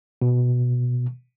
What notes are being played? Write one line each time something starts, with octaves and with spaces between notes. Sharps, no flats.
B2